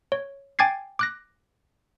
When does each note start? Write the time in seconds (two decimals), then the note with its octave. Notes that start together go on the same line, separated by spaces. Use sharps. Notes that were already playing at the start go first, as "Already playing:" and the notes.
0.12 C#5
0.59 G5 G#5 D6 G#6 A6 C7
0.99 D6 F#6 A#6